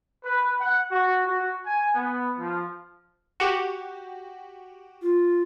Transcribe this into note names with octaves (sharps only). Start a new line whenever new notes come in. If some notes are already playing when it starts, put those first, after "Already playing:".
B4
F#5
F#4
F#4
G#5
B3
F3
F#4 G4
F4